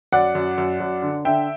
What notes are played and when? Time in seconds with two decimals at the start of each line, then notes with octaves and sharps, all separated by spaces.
0.12 F#2 D5 F#5
0.35 F#2
0.58 F#2
0.80 F#2
1.02 D3
1.25 D3 E5 G5